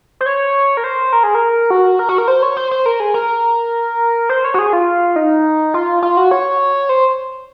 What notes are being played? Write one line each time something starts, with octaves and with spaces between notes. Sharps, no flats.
C5
C#5
A#4
C5
A#4
G#4
A#4
F#4
A#4
F#4
A#4
C5
C#5
C5
C5
A#4
G#4
A#4
C5
C#5
F#4
G#4
F4
D#4
F4
F4
F#4
C#5
C5